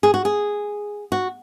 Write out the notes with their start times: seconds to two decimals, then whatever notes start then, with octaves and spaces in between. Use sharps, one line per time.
0.03 G#4
0.14 F#4
0.25 G#4
1.12 F#4